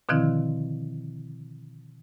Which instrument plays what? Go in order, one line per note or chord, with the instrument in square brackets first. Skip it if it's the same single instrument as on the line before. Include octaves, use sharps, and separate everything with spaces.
[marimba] B2 D3 D#3 F3 C4 E4